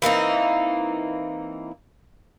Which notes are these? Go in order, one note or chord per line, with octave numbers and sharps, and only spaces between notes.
E3 A#3 C4 D#4